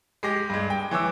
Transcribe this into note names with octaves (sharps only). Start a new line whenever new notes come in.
G#3 G4 D6 A#6
G2 G#3
G5
E3 C#5 D6 E6